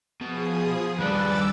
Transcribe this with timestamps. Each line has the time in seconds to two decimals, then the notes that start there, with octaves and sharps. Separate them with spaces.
0.21 B2 F3 G#4 D#6
0.99 D#2 G3 D4 B4 D6 E6 A6